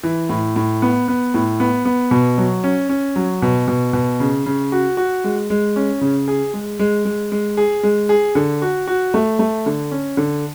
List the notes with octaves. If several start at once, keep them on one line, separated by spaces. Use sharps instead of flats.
E3
A2
A2
B3
B3
A2
B3
B3
B2
F#3
C#4
C#4
F#3
B2
B2
B2
C#3
C#3
F#4
F#4
G#3
G#3
C#4
C#3
G#4
G#3
G#3
G#3
G#3
G#4
G#3
G#4
D3
F#4
F#4
A3
A3
D3
C#4
D3